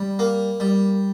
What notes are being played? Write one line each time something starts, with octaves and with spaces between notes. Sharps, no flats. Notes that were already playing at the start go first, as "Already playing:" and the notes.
Already playing: G3
A#3
G3